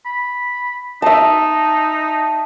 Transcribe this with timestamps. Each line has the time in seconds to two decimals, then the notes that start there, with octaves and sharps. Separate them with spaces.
0.05 B5
1.02 D#4 E5 A5